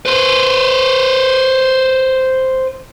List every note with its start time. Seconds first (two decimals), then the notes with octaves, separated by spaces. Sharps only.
0.06 B4 C5